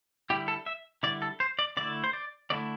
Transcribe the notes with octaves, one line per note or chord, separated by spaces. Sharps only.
D3 G3 E4 G4
A4
E5
D3 G3 E4 D5
A4
C5
D5
D3 A3 E4 D5
C5
D5
D3 A3 E4 D5